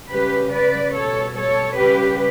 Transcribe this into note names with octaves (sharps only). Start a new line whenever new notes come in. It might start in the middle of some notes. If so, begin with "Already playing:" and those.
C#3 G3 G4 B4
B4 D5
B2 G3 A4 C#5
A4 C#5
C#3 G3 G4 B4